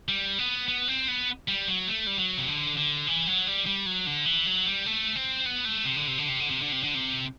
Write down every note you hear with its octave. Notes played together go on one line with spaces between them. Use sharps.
G3
B3
B3
C4
B3
G3
F#3
A3
G3
F#3
C3
D3
D3
E3
F#3
G3
G3
F#3
D3
E3
F#3
G3
A3
C4
B3
A3
C3
D3
C3
D3
C3
D3
C3
D3
C3
D3
C3